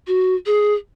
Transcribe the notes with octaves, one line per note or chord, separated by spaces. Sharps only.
F#4
G#4